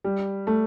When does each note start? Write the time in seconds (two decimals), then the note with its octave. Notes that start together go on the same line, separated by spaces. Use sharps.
0.04 G3
0.47 A3